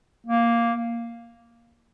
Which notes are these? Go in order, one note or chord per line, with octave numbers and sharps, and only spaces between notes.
A#3